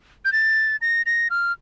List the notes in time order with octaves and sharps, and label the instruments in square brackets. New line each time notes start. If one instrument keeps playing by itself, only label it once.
[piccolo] G6
A6
A#6
A#6
F6